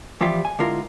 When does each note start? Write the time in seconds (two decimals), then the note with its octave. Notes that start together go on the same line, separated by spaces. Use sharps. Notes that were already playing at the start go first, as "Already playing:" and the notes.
0.21 E3 F3 G3 F4 G4 E5
0.45 G#5
0.59 D3 G#3 E4 F4 A#4